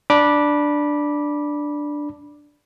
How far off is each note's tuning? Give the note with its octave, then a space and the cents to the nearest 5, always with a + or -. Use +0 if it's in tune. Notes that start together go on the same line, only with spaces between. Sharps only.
D4 +0 B5 -20 D6 +0